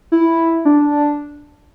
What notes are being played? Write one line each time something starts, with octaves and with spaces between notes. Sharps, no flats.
E4
D4